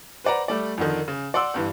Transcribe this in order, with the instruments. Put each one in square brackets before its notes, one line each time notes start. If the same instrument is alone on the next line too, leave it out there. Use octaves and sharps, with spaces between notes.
[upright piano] B4 C5 D5 F#5 A#5
G3 A3 D5
F2 D3 D#3
C#3
D5 F#5 C6 D6 E6
G1 G2 E3